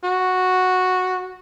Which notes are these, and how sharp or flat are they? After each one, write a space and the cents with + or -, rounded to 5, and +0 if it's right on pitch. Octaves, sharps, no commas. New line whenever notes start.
F#4 -5